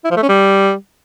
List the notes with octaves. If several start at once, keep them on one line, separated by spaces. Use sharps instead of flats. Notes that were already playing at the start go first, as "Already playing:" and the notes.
E4
F3
A3
C#4
G3